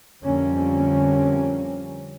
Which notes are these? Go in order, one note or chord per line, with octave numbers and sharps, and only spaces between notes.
F2 D3 G3 A#3 C4 C#4